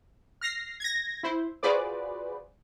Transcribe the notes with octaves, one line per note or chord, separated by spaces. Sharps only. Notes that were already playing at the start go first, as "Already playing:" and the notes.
F6 A#6 C7
G#6 A#6
E4 C5
F4 F#4 G#4 B4 C5 D5